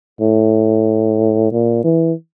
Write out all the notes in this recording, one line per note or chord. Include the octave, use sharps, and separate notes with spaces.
A2
A#2
E3